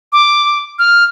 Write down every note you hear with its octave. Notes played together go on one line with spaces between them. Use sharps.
D6
F6